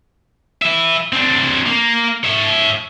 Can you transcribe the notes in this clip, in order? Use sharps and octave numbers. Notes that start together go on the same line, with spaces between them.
B4 E5
C4 D4
A#3
C#5 E5